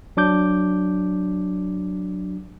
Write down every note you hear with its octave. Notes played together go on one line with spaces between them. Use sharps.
F#3 D4 D6 G6